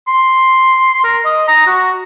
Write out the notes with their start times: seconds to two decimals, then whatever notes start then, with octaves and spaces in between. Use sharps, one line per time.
0.07 C6
1.04 A#4
1.25 D#5
1.48 A#5
1.67 F#4